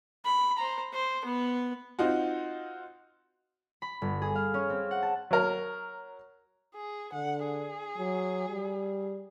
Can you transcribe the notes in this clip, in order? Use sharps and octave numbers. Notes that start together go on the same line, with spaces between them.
B5
C5 A#5
C5
B3 B4
C4 D#4 F4 F#4
B5
G1
G#4
F5
C#4
C4
F#5
A5
F#3 A#4
G#4
D3 F#5
G#4
F#3
G3